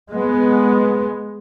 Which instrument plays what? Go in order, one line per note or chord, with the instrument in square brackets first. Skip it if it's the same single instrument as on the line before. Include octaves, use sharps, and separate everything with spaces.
[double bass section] G#3 B3